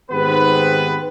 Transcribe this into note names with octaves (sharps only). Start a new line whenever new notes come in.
G#2 D#3 B3 C4 G4 B4